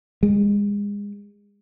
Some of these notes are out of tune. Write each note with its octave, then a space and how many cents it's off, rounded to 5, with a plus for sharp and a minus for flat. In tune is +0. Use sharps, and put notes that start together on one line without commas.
G#3 -30